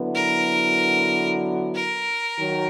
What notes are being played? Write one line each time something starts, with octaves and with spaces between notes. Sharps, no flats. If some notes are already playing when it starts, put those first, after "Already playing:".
Already playing: D3 F#3 B3 E4
A#4
A#4
D#3 F#3